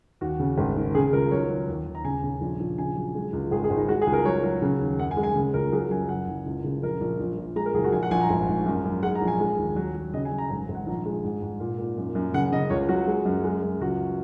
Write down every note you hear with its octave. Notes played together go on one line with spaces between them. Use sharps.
D#2 F#4
C#3
G#1
D#3
C#3 G#4
C#2 A#4
F#3 C#5
D#3
D#2
D#2
A#5
C#3 G#5
C#3
A#1
A#1
C#3 G#5
F#3
G#3
C#2
G#1 G#4
G#4
G#1
D#4
G#3 F#4
G#4
C#2
A#4
F#3 C#5
F#3
C#3
D#2
F#2 F#5
G#5
G#3
G#5
C#3
C#2 A#4
F#3 G#4
F#2 G#5
F#1 F#5
F#1
C#2
C#3
A#1 A#4
A#1
A#1
A#2
G#3 A#5
A#4
F#1 G#4
F#4
A#1 G#5
F#5
A#1 G#5
A#5
G#1 G#5
G#2
F#2
F#2
G#3 F#5
A#5
A#1
G#5
G#3
D#2
F#3
F#3
C#3 D#5
G#5
F#3
A#5
G#1 G#5
G#1
F#5
A#1 A#5
G#3
G#2
G#2
A#2
A#2
F#2
F#2
C#3 F#5
C#3 D#5
C#2 C#5
F#3 F#4
G#3
F#2
G#3
F#2
C#2 F#4